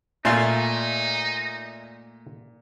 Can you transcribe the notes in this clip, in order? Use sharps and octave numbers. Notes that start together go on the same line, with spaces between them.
A#2 A3 D#4 F4 E5 G#5 C6